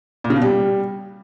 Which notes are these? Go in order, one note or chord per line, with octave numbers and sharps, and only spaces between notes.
A#2
C#3
B2
G3